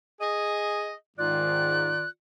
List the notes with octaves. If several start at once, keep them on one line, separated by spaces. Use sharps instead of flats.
G#4 D#5
G#2 D#3 F4 D5 F#6